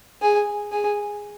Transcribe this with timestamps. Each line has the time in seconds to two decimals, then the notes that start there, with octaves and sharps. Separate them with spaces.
0.22 G#4
0.72 G#4